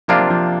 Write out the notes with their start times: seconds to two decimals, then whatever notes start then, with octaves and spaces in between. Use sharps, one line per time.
0.08 C3 F3 A#3 D4 F4
0.19 F3
0.30 F3